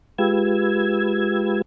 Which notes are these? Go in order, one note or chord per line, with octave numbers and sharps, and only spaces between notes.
G#3 F4 G4 B4 E6 G#6